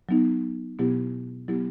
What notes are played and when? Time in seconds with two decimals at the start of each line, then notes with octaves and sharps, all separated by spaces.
0.09 F#3 B3 D#4
0.79 B2 F#3 B3 E4 G4
1.48 F#3 B3 E4 G4